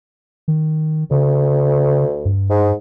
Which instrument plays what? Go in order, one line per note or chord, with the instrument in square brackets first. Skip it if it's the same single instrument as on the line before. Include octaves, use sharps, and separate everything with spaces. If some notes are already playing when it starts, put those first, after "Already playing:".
[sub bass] D#3
[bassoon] D2 [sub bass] C#3
[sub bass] G2
[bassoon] G#2